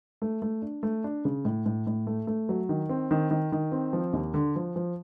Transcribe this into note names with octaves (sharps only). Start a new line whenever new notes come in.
A3
A3
D4
A3
D4
C#3
A2
A2
A2
A3
A3
F#3
D#3
C4
D#3
D#3
D#3
C4
F3
D#2
D3
F3
F3